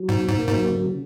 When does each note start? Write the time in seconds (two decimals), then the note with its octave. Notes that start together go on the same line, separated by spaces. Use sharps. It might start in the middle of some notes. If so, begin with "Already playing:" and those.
Already playing: F#3
0.08 G#2 B2
0.23 B2
0.29 G#2
0.39 A#3
0.49 G#2 F#3
0.70 C#3
0.85 C#3